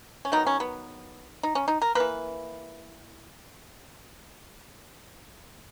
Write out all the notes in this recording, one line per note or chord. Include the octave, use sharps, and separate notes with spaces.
C#4
D#3 F#3 B3 D#4
C#4
B3
D#4
C#4
D#4
A#4
E3 A#3 B4